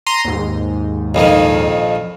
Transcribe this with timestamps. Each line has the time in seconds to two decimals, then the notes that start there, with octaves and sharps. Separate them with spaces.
0.06 A#5 C6 D#7
0.25 D#2 G#2
1.15 A#1 F2 D#3